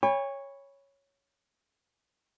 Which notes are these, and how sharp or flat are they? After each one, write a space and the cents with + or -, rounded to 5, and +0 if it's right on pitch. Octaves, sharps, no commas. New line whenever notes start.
C#5 +0 G#5 -45 B5 +0